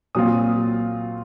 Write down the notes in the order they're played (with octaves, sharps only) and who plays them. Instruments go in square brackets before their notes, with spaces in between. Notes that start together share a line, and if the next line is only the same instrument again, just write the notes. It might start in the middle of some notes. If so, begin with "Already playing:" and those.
[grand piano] A#2 F#3 C4 F4 D#6